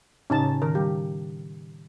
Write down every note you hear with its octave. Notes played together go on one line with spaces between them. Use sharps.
A2 C#3 C#4 D#4 A5
D#3 A#4
G3 G4